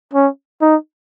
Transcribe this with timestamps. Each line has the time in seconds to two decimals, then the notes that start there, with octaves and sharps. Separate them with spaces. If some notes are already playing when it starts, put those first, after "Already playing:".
0.14 C#4
0.61 D#4